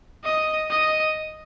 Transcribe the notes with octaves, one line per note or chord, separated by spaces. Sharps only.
D#5
D#5